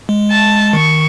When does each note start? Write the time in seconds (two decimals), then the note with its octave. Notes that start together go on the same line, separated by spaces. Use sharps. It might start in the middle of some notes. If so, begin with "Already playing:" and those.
0.09 G#3
0.31 A5
0.73 D#3 C#6